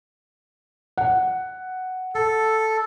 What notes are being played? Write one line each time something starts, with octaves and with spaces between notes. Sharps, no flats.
F#5
A4